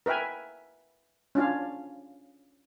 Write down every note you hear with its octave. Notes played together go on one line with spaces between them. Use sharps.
A#4 B4 E5 G5 G#5
C#4 D4 F4 F5